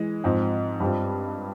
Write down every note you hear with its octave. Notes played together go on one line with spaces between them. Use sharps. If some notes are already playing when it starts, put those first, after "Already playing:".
Already playing: E3 G#3
G#2 F3 C4
G2 G3 C4 F4